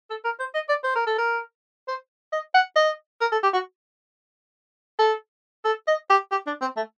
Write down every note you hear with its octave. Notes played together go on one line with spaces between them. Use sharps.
A4
A#4
C5
D#5
D5
C5
A#4
A4
A#4
C5
D#5
F#5
D#5
A#4
A4
G4
F#4
A4
A4
D#5
G4
G4
D4
C4
A3